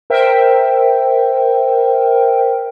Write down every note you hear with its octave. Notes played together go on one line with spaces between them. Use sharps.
A#4 C5 E5 G5